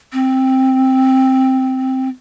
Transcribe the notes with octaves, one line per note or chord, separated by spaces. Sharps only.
C4